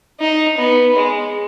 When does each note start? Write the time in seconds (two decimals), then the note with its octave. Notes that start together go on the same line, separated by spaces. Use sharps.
0.20 D#4
0.58 B3
0.96 G#3